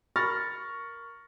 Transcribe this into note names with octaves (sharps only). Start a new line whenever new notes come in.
A#4 B5 C#6 F6 A6 A#6